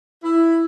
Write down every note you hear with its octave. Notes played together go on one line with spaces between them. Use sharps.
E4